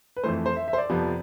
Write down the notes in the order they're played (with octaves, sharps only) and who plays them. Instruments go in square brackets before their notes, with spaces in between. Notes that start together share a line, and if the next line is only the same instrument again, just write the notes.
[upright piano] B4
F2 E3 A3 C5
C5
E5
E5
C5
D5
F2 C3 F3 B3